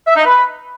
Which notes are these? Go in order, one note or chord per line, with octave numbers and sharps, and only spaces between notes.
E5
D#4
B4